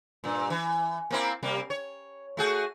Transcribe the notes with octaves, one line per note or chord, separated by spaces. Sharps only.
G2 A#2
E3
A#3 C4 E4
C3 G3 A#3
C#5
A3 F#4 G#4